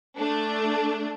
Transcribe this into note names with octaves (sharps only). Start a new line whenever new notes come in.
A3 D4